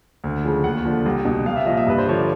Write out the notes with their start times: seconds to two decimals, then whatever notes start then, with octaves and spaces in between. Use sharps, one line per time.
0.24 D2
0.45 C#3 F3
0.64 D#2 F#5
0.85 D3 F3
1.06 C2
1.25 B2
1.46 C2 F5
1.56 E5
1.66 A#2 F3 D#5
1.77 E5
1.87 G2 B4
1.98 C5
2.06 D3 F3 C#5
2.18 D5